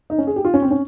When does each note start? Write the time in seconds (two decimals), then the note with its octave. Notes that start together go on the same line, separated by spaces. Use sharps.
0.10 D#4
0.18 C#4
0.27 G#4
0.36 G4
0.45 F4
0.54 C#4
0.62 C4
0.71 C#4